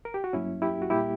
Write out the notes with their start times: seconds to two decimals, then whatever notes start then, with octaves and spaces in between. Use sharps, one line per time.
0.05 A#4
0.14 G4
0.24 F#4
0.33 G2 F#3 A#3 C#4 E4
0.62 E4 G4
0.82 F#4
0.90 A#2 G3 A#3 E4 G4